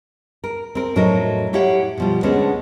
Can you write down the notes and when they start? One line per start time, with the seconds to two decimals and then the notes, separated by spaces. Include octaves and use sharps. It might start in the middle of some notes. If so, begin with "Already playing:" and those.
0.44 A#4
0.75 C4 A#4
0.95 F2 A2 F#3 C#4 D#4 A#4
1.53 A3 E4 G4 C#5 F5 F#5
1.97 B2 F3 G3
2.23 D2 D3 G#3 B3 C#4 D4